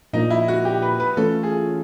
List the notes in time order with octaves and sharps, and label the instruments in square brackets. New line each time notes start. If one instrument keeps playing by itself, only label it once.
[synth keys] A#2 F3 A#3 D4 [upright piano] D#4
[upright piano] E4
F#4
G4
B4
B4
[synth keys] E3 A3 C#4 F4 [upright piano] A4
[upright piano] G#4